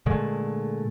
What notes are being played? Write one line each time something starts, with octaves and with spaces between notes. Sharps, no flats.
A#2 D3 G#3 A3